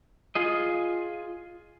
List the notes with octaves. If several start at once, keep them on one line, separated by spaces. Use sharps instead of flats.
F4 G#4 D#5